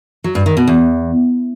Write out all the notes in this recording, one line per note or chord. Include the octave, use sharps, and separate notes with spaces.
F#3
G2
D#3
B2
E2